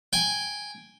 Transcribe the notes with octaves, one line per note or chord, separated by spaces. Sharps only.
G5 G#5